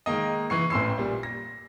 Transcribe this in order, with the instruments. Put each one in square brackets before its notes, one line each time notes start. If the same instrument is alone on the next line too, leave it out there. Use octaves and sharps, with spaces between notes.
[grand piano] D#3 G#3 A#3 D#5
E3 C#6 C7
A1 C4 C6 E6 C7
A#2 G3
A#6